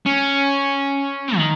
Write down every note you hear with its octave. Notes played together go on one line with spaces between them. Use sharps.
C#4
D#3